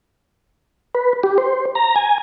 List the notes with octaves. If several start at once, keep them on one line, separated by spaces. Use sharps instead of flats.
B4
G4
C5
A#5
G#5